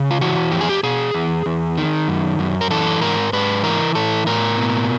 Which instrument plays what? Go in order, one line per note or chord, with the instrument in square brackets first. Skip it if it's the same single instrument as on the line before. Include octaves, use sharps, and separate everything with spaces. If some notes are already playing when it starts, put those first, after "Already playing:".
Already playing: [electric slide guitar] C#3
F4
E3 F#4
F2 G4
G#4
G4
B2 G#4
E2
E2
D#3
F#2
F#2
A#4
E3 A4
G#2 A#4
G#2 B4
E3 A#4
A2 A4
A2 A#4
B2